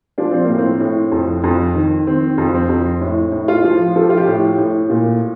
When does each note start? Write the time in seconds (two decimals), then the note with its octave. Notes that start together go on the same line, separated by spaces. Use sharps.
0.18 F3 D4
0.31 C4
0.44 A2 A#3
0.58 C4
0.80 A2
1.12 F2
1.44 F2
1.75 D#3
2.07 D#3 C4
2.38 F2
2.54 C4
2.69 F2
3.01 A2
3.32 A2
3.48 F4
3.64 F3
3.95 F3 A4
4.03 G4
4.10 F4
4.17 G4
4.27 A2
4.58 A2
4.90 A#2